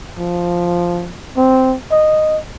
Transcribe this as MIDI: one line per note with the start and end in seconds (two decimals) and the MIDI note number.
0.19 1.12 53
1.37 1.76 60
1.92 2.39 75